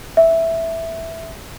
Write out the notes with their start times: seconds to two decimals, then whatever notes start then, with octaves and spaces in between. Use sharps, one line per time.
0.17 E5